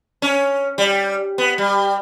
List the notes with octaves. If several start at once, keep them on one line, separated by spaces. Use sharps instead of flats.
C#4
G3
B3
G3